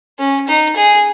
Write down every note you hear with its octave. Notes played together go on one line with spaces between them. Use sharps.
C#4
D#4
G#4